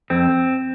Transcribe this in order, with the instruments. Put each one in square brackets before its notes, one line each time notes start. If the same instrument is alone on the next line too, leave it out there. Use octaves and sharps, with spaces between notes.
[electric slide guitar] F2 C4